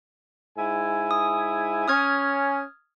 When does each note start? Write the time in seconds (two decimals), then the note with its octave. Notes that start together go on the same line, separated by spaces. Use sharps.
0.57 G#2 E4 G#5
1.11 D#6
1.88 C#4 D#6 F6 G#6